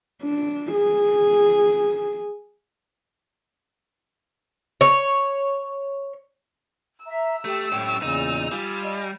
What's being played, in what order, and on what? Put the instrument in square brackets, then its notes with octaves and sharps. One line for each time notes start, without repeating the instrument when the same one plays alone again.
[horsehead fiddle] D4
G#4
[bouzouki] C#5
[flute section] E5 A#5 [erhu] E6
[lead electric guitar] A3 [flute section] G4
[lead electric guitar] F#2 G4 [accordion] A2 C#6 [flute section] D5
[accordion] E2 A#2 C#3 [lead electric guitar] D#4
[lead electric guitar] G3 [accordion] F4 G#5
[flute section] D5 D#5